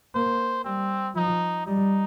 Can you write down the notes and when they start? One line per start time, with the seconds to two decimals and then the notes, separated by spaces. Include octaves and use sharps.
0.15 A#3 C5
0.65 G3 C4
1.15 F3 D#4
1.67 G3 D#4